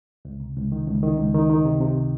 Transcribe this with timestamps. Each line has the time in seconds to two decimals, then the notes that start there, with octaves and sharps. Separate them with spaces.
0.25 C#2
0.40 C3
0.56 C#2
0.72 D#3
0.87 C#2
1.03 D#3
1.18 C#2
1.34 D#3
1.50 D#3
1.65 C3
1.80 C3